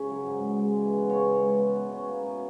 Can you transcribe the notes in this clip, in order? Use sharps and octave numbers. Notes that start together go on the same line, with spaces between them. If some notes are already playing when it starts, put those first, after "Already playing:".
Already playing: C#3 C#4 B4
F#3
G#2
G#2
G#3
E3
B3
C#3 C#5
G#3
E3
B3
B2
C#4
A#3
B2